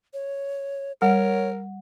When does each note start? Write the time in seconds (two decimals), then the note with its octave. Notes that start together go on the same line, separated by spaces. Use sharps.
0.13 C#5
1.02 G3 A#4 C#5 F#5